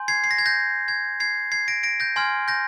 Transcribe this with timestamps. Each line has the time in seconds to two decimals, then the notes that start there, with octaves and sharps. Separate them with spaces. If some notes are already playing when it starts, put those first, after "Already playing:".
Already playing: G#5 C6 G6
0.08 G#6 C7
0.24 C7
0.31 A#6
0.38 G#6
0.46 G6 A#6
0.88 G#6
1.20 G#6 C7
1.52 G#6 C7
1.68 A#6 D7
1.83 A#6 D7
2.00 G6 A#6
2.16 G#5 C6 F6 G#6
2.48 G6 A#6